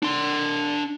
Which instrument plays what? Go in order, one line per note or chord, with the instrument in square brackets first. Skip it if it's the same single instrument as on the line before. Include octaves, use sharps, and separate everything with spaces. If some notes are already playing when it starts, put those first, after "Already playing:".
[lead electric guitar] D4 C6